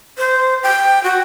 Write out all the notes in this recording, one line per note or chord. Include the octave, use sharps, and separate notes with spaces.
C5
G5
F#4